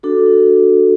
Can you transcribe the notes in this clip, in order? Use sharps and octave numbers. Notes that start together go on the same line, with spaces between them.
D4 F#4 A4